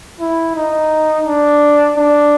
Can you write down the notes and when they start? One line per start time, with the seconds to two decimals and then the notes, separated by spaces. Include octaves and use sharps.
0.20 E4
0.56 D#4
1.26 D4
1.97 D4